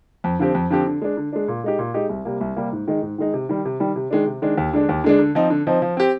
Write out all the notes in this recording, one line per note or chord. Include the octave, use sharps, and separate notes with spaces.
F2
D3 F3 C4 G4
F2
D3 F3 C4 G4
D3
G#3 D4
D3
G#3 D4
A#2
G#3 D#4 G4
A#2
G#3 D#4 G4
C2
C3 G3 A#3
C2
C3 G3 A#3
G#2
D#3 G#3 D#4
G#2
D#3 G#3 D#4
C3
D#3 G3
C3
D#3 G3
C3
D#3 G#3 D4
C3
D#3 G#3 D4
D#2
D3 G#3 D4
D#2
D3 G#3 D4
D3
F3 C4 D#4
D3
F3 C4 D#4
F3
C4 G4